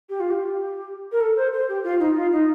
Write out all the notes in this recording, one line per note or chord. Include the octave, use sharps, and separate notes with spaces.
G4
F4
G4
A#4
A4
C5
C5
G4
F4
D#4
F4
D#4